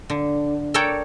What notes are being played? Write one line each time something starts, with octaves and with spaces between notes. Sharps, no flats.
D3
A4 A#4 C#5 D5 G5